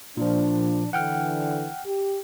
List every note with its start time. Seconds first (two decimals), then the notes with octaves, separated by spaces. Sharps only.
0.17 A#2 F3 D4
0.93 D3 E3 F#5 G5 F6
1.86 G4